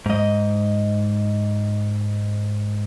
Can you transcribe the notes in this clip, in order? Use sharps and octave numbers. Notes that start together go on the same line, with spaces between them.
G#2 D#5